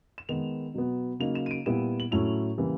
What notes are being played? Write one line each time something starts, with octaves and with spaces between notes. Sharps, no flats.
E7
D#3 G#3 B3 F7
B2 F#3 B3
C#3 F#3 A#3 D#4 F7
E7
D#7
D7
A#2 G3 B3 E4 E7
F#7
A2 F#3 A3 C#4 E4 F7
C#3 E3 G3 A#3